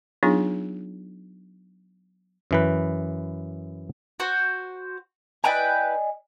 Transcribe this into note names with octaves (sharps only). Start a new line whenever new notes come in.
F#3 B3 D4 D#4 F4 G#4
F#2 E3 B4
F#4 C5
E4 B4 D5 D#5 G5 G#5